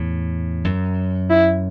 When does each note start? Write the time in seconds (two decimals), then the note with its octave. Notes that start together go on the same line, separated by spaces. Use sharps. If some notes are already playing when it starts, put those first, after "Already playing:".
Already playing: E2 A2
0.64 F#2
1.30 E4